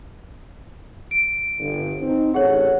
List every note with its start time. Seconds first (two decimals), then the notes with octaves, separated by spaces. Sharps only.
1.11 D7
1.59 G1
2.00 C4 D#4
2.34 A1 G#4 A4 C#5 F#5